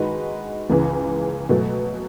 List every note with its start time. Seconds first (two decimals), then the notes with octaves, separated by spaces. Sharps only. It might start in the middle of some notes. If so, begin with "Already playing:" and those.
Already playing: D#3 G#3 D#4 F#4 B4
0.70 C#2 C#3 E3
1.49 B2 F#3 A3